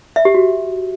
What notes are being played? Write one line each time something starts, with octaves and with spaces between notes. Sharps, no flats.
E5
G4
F#4